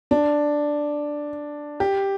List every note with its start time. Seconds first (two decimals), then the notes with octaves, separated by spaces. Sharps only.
0.11 D4
1.80 G4